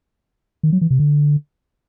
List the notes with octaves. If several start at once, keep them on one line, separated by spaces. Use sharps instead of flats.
D#3
F#3
E3
C3
D3